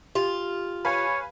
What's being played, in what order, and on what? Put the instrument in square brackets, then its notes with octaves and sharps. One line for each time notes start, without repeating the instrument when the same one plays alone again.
[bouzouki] F4 [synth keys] G4
[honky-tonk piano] B4 F5 G#5 [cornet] C#5